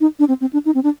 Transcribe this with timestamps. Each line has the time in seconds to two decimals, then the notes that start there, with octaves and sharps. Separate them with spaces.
0.01 D#4
0.19 D4
0.28 C4
0.41 C4
0.53 D4
0.66 D#4
0.75 C4
0.84 D4